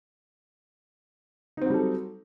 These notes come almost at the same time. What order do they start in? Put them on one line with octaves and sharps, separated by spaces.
D#4 C4 F#3 G3 A4